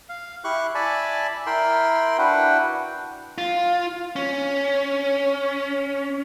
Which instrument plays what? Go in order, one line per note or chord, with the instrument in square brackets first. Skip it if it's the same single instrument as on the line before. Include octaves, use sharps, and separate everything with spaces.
[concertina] F5
E4 G4 C#6 F#6
D5 E5 G#5 A5 B5
E4 A#4 G5 B5 C6
D4 E4 F#4 B4 F#5 G5
[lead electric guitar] F4
C#4